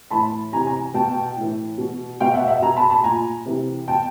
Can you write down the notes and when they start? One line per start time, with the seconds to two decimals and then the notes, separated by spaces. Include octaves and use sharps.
0.10 A2 E3 A5 B5
0.52 C3 E3 G#5 A#5
0.67 G#5 A#5
0.94 B2 G5 A5
1.36 A2 E3
1.78 B2
2.20 B2 F5 G5
2.34 E5 F#5
2.48 E5 F#5
2.62 B2 G#5 A#5
2.76 A5 B5
2.90 A5 B5
3.04 A#2 G#5 A#5
3.45 C3 E3
3.88 B2 G5 A5